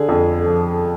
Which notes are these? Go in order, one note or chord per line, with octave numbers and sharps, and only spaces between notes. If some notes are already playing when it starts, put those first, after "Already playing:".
Already playing: D3 G#4
F2
F3